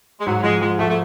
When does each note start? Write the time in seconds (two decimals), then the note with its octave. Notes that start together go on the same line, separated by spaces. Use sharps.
0.20 G#3
0.27 G#2 F#3
0.43 F3 G#3
0.61 F3 G#3
0.79 F3 A3
0.89 A3